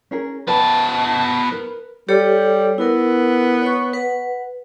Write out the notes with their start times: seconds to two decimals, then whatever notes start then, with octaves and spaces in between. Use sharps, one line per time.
0.11 C#4 G#4 A#4
0.48 B3 B4 G5 A5 B5
1.51 A#4 B4
2.09 G3 G4 A4 C#5
2.78 B3 E4 A#4
3.62 C#5 C#6
3.93 B4 F#5